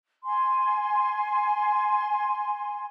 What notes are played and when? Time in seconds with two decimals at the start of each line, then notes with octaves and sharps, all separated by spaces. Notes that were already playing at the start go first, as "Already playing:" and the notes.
0.25 G#5 C6